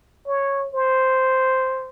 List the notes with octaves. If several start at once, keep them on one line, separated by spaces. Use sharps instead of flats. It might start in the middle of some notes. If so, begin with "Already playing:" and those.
C#5
C5